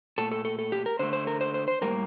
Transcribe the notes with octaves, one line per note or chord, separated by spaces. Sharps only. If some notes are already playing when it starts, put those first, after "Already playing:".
A#2 A3 A4
A4
A4
A4
G4
A#4
D3 A3 C5
C5
A#4
C5
C5
C5
A2 G3 A#3 A#4